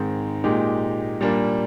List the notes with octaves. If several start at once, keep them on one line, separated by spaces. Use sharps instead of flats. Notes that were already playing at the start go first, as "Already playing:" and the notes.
Already playing: G#2 D#3 G#3 C4
A#2 G#3 D#4 G4
A#2 G3 A#3 D4